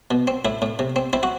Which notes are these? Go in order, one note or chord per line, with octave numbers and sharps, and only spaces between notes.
B2
C4
A2 E4
A2
C3
C4
C4 E4
F#4